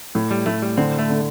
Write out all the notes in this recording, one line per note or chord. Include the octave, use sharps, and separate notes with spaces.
A2
G3
A2 A3
G3
D3 C4
A3
D3